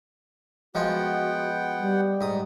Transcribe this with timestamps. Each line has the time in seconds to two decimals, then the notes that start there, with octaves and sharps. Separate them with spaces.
0.75 F3 G#3 B3 F4 F#4 F#5 G5
1.80 G3
2.21 G#2 D#6